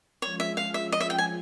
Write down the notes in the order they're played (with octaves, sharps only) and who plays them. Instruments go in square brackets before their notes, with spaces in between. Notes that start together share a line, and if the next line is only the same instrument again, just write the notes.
[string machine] F3 G#3 C#4 F4 [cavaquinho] C#5
[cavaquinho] E5
F5
E5
D#5
E5
G5
G#5